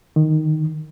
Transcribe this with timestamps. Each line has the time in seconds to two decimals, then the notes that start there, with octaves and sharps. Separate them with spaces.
0.16 D#3